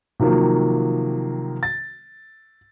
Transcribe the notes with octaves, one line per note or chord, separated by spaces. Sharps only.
C3 D#3 F3 F#3 A#3
A6